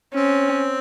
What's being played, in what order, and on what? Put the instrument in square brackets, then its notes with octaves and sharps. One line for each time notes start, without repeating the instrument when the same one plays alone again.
[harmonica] C4 [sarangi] C#4